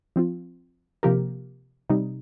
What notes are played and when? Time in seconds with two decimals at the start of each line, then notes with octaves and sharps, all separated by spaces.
0.16 F3 C4 F4
1.03 C3 F3 A#3 G4 A#4
1.90 C3 G3 D#4